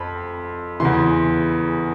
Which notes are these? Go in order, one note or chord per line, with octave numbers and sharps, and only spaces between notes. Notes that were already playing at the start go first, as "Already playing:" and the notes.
Already playing: F2 B5
E2 C#3 E3 C6